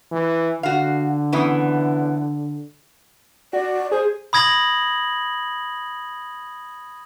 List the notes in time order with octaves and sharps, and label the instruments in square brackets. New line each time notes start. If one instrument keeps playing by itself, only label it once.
[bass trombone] E3
[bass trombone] D3 [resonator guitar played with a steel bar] F#4 F5
[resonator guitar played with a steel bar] C#3 E3 B3
[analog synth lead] F#4 [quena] D5
[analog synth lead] G#4 [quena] C5
[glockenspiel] B5 D#6 G#6 A#6 F#7